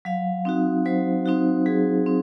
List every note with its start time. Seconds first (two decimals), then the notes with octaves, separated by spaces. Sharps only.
0.05 F#3 F5
0.45 C4 D#4 F#4
0.86 F#3 C5
1.26 C4 D#4 F#4
1.66 F#3 G#4
2.06 C4